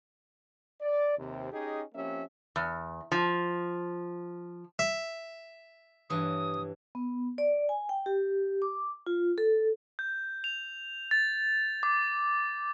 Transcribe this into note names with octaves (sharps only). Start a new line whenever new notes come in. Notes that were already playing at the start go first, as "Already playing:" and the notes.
D5
D#2 C3
C#4 D#4 G4 G#4 D#5
F3 A#3 C4 C#4 G4 E5
E2
F3
E5
G2 E3 C#5 D#6
B3
D5
G#5
G5
G4
D6
F4
A4
G6
F7
A6
D6